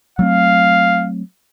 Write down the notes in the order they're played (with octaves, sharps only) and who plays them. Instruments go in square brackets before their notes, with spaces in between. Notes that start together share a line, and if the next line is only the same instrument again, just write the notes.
[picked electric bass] F#3 A3 C4 [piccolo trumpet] F5